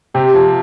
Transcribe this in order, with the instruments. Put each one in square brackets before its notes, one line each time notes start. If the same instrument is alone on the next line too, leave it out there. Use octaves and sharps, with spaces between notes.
[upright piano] C3 [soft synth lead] G4
[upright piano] F3